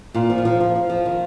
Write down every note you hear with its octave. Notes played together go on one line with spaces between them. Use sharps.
A#2 F4
F3
F4
F3
F3
F3
F3
D#3